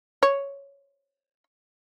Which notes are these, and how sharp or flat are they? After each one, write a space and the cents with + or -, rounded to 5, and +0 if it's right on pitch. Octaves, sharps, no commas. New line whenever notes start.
C#5 +5